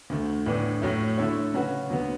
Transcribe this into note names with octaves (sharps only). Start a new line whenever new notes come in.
D2 D3 A3
A2 E3 B3 D4
A2 F#3 A3
D3 A3 E4 A4 C#5
C#3 F#3 C#4 F#4 B4
D2 D3 F#3 B3